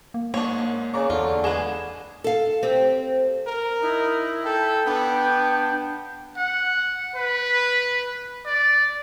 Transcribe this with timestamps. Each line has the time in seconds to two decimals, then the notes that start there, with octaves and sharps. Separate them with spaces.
0.14 A#3
0.34 G#2 A#3 D4 C#5
0.94 C#3 D5 A#5 C#6
1.10 E2 D3 F4
1.44 G#3 B3 G#4 E7
2.24 A4 F5
2.63 C4 G4
3.47 A#4
3.82 D#4 E4
4.45 A4 G5
4.86 B3 D4
6.37 F#5
7.15 B4
8.46 D5